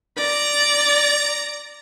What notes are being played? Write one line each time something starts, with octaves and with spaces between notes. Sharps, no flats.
D5 A#5